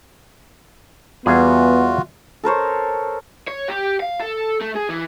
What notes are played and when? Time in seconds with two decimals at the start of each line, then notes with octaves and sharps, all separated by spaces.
1.26 E2 G3 B3 F4 F#4 G#4
2.43 A4 A#4 C5 C#5
3.48 C#5
3.68 G4
4.00 F5
4.20 A4
4.61 A3
4.75 G#4
4.89 E3